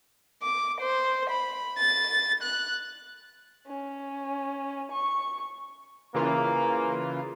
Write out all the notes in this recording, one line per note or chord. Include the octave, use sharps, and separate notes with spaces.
D6
C5
B5
A6
F#6
C#4
C#6
C#3 E3 A#3 F4